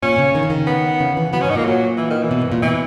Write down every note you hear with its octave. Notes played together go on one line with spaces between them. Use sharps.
A#2 C#4
C#3
D#3
C#3
D#3
B3
C#3
E3
F#3 B3
C#4
G#2
D#4
A#2 A#3
F#3
E3
D#3
E3
B2
G#2
A#2
B2 E3